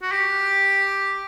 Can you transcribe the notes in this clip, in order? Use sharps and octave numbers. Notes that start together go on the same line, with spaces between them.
F#4
G4